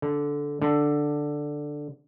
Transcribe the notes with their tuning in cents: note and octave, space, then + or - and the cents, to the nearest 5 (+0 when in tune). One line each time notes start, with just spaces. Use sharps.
D3 -10
D3 +5